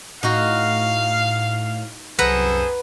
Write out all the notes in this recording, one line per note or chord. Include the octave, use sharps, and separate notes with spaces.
A2 D#4 F#4 F5
C2 F#2 G#4 A4 B4 C5 F#5 A#5